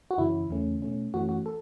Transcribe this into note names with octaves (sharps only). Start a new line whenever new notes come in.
F#4
F#2 C#3 E3 C#4 E4
E2 C#3 A3 C#4
B2 A3 C#4
F#2 E3 A3 C#4 F#4
F#4
A4